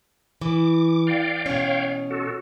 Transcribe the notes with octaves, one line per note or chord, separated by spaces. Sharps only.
E3 D6
D5 F5 G5
B2 C#4 C#5 F5 G5
F#4 A4